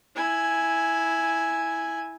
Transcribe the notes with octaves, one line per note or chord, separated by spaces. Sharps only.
E4 G#5